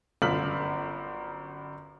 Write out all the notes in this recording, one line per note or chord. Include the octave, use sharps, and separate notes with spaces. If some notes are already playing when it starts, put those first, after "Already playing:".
G1 F#2 F5 F6 B6 F#7